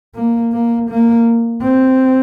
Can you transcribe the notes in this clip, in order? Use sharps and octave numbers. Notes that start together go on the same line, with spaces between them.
A#3
A#3
A#3
C4